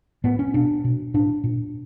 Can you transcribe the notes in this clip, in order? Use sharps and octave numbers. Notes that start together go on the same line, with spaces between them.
A2 B3
C#4
B2 D4
B2
A2 D4
A#2